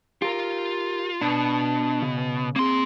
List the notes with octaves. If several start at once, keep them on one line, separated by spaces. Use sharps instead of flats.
F4 G4 A#4
B2 D4
C#3
A#3 C4 G#4 C6